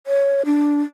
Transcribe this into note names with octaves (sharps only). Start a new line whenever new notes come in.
C#5
D4